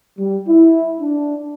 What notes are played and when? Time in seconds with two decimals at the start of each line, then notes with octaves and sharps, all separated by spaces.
0.18 G3
0.47 E4
1.00 D4